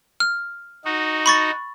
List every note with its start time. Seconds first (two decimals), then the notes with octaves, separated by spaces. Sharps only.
0.20 F6
0.85 D#4 F#4
1.26 B5 C#6 A6